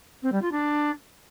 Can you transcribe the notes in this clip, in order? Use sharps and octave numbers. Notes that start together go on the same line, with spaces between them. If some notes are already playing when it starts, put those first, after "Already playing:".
C4
G3
F4
D4